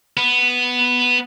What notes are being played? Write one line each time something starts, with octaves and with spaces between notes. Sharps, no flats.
B3